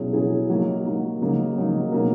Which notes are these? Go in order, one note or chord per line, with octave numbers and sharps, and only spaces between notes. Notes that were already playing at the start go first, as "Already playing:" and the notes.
Already playing: B2 F#3 C#4 E4 G#4
B2 F#3 C#4 E4 G#4
F#3 A#3 D#4
F#3 A#3 D#4
C#3 F#3 A#3 D#4
C#3 F#3 A#3 D#4
B2 F#3 A#3 D#4 A#4